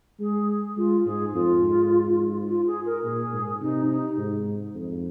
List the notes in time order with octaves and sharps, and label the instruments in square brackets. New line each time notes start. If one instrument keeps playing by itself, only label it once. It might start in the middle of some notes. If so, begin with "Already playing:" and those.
[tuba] G#3 [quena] G#4
[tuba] G#3 [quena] F4
[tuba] G#2 [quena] G#4
[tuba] F2 [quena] F4
[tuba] G#2
[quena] F4
G#4
A#4
[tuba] A#2 [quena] G#4
[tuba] G#2
[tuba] C3 [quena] D#4
[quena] D#4
[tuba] G#2
F2